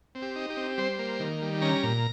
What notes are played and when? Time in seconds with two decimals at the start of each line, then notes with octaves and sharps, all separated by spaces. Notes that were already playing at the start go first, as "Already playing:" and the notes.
0.15 C4
0.22 G4
0.36 D#4
0.50 G4
0.57 C4
0.78 G3 C5
0.99 A#3
1.20 D#3
1.42 G3
1.62 C#4 A#5
1.83 A#2